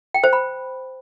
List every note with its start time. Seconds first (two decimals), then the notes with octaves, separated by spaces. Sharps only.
0.14 G5
0.24 C5
0.33 B5